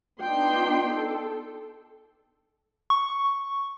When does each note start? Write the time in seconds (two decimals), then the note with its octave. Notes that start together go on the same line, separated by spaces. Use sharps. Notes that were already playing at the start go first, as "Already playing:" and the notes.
0.20 B3 D4 D#4 F4 G5 C6
0.91 A4
2.90 C#6